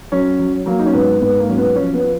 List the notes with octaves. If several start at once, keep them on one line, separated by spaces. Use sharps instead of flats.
F#3 C#4
F#3
F#3 A#3
D#4
C#4
G#2 B3
G#2 B3
A#3
F#3 C#4
B3
F3 C#4
B3
F3